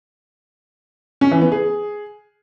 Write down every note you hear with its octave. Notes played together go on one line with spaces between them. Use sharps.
C#4
E3
B3
G#4